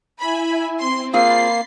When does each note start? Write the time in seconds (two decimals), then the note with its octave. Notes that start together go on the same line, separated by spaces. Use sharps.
0.19 E4 E5 G#5 B5
0.79 C4 C6
1.13 A#3 C4 F4 G#4 B5 C6 A6 C7